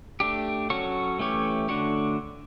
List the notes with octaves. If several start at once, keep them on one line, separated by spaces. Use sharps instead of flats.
A3 D4 G4
F#3 C#4 F#4 A4 C#5
E3 A3 C#4 G4 C#5
D3 A3 D4 F#4 C#5